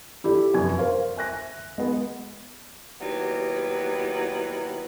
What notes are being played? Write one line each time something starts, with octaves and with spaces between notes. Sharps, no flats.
E4 G4 A4 D5
F1 F#2 D5 G#5 G#6
A#4 C5 F5
E5 G#5 F#6 A#6
G#3 B3
D#2 F#3 G3 B3 E4 B4